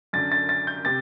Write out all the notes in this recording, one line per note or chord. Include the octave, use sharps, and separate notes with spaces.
F#2 D3 A6
A6
A6
G6
C3 A6